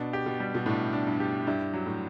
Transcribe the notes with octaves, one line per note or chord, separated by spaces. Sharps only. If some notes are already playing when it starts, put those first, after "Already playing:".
Already playing: B2 D4
G4
B2
G3
B2
A2 D4
D4
G2
G4
G2 E4
F#3
A2